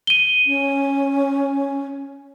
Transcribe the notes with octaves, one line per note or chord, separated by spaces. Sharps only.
D#7 G7
C#4